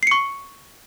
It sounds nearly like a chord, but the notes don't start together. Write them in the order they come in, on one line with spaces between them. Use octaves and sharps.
C7 C#7 C#6